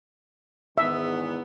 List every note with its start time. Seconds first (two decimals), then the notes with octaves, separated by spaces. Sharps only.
0.78 E2 G#2 D#3 B3 E5